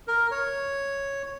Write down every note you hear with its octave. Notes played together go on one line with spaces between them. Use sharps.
A#4
C#5